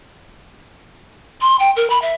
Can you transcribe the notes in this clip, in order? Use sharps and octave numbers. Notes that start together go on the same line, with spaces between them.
C6
G5
A#4
B5
E5